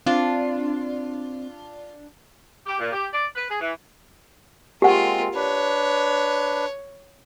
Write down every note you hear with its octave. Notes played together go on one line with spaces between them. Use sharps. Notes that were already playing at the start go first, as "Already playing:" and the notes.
C4 D4 F4
G4
A#2
G4
D5
B4
G#4
E3
G#3 A#3 C4 F4 G4 F#5
D4 B4 C#5